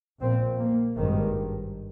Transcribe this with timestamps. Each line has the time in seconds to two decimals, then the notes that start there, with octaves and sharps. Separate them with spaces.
0.21 A#1 A#2 C4
0.59 A#3
0.97 G#1 G2 D#3